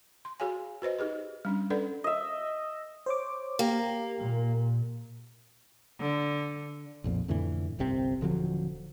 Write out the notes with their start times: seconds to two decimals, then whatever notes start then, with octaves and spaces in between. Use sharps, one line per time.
0.25 C6
0.40 F#4 G#4 C#5 F5 G#5
0.82 F#4 B4 C5 D#5
0.99 D#4 G4 G#4 B4
1.45 G3 C#4 D4
1.70 C#4 D4 A4 B4 D5 F#5
2.04 D#5 E5
3.06 C5 C#5 D6
3.59 A#3 G4 A#4
4.19 A#2
6.00 D3
7.04 B1 F2 A#2
7.28 F2 A2 D3 E3
7.79 G1 C2 C3 C4
8.21 D#1 D3 F3 F#3